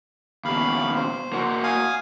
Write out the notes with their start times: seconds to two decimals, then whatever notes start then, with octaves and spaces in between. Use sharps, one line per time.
0.45 D#2 B2 F5 B5
0.95 C5
1.33 A#3 F#4
1.63 F5 G#5 D#6